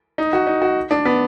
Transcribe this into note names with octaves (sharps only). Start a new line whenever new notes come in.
D#4
F#4
D#4
F#4
D4
B3